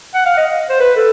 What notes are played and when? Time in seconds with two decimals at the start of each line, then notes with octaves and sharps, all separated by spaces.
0.15 F#5
0.26 F5
0.37 D#5
0.70 C5
0.80 B4
0.96 A4